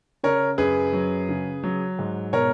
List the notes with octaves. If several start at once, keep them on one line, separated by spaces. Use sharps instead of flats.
C#3 A#4 C#5
F#2 G#4 B4
F#3
C#3
F#3
G#2
B2 A#4 C#5